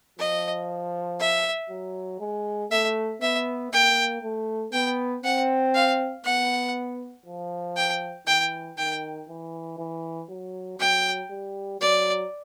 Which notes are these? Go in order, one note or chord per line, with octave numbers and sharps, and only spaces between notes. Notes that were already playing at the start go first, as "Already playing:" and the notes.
F3 D#5
E5
F#3
G#3
A3 E5
B3 E5
A#3 G5
A3
B3 G5
C4 F#5
F5
B3 F#5
F3
G5
E3 G5
D#3 G5
E3
E3
F#3
F#3 G5
G3
F#3 D5